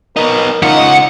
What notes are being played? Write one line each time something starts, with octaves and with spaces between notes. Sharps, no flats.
B3 D#4 A#4
C#3 D#4 F4 F#5